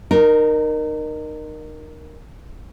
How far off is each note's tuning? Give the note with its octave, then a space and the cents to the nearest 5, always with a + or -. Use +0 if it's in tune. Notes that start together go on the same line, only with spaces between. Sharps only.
D#4 -30 A#4 +5